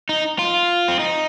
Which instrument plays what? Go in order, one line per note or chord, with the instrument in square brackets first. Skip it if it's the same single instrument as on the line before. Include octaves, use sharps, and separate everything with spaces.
[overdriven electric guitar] D#4
F4
C4
D#4